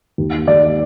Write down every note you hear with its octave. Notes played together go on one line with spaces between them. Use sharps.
D#2
D#2 D5